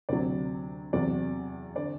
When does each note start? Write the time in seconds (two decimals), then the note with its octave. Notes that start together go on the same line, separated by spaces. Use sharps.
0.09 D2 C3 F#3 D5
0.93 E2 C3 F#3 D5
1.76 D3 D5